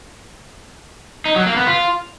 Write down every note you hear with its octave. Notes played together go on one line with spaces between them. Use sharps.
D#4
F#3
A#3
B3
F4